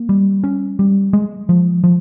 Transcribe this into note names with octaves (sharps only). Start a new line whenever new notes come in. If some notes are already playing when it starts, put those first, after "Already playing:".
Already playing: A#3
G3
C#4
G3
G#3
F3
F3